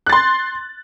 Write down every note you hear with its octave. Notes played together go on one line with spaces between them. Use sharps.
C6 F#6 A6